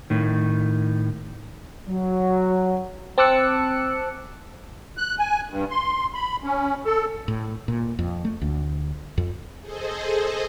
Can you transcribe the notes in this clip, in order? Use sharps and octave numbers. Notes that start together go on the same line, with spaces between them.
A2 D#3
F#3
C4 A5 D6 E6 F#6 C#7
F#6
G#5
G2
C6
B5
C#4
A4
A2
A#2
F2
A3
D2
F2
G#4 A4 C5 D#5